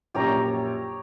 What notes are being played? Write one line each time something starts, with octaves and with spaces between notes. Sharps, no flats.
A#1 F#2 G4 C#5 A#5